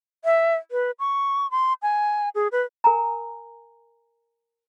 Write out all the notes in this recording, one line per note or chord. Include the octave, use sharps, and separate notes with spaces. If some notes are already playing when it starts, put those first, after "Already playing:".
E5
B4
C#6
C6
G#5
G#4
B4
A#4 G#5 A#5